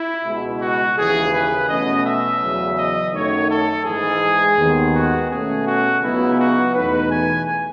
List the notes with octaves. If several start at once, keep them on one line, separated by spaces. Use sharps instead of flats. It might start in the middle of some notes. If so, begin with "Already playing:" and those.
Already playing: E4
C#2 B2 G#3
F#4
D#2 C#3 E3 G#4
B4
B2 A3 C#4 D#5
E5
E2 C#3 F#3
D#5
F#2 D#3 A3 D#4 C#5
A4
G#2 E3 G#3 G#4
D#2 D#3 G#3 B3
F#4
B2 A3 C#4 G#4
F#4
C#2 C#3 F#3 B3 D#4 E4
F#4
E2 B2 A3 D#4 B4
G#5